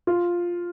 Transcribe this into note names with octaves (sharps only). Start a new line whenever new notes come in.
F4